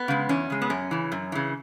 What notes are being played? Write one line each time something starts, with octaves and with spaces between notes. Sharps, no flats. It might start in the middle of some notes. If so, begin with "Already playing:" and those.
Already playing: B3
C#3 G#3
E2 C#4
C#3 G#3
B3
F#2 C#4
C#3 E3
F#2
C#3 E3